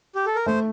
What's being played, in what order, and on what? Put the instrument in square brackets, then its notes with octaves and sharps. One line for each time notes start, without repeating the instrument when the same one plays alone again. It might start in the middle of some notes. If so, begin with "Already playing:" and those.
[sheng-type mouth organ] G4
A4
A#4
[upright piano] A3 [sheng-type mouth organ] C5